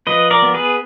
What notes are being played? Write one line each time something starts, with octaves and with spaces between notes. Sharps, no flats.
F3 B4 D#5
A#4 D5
B3
G#4 B4